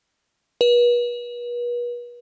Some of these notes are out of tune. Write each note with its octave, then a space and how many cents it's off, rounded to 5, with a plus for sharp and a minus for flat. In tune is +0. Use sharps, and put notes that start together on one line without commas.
B4 -40